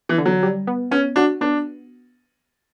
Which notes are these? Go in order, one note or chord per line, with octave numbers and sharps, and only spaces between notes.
E3
D3
F#3
G3
B3
B3 C#4
D4 F#4
B3 D4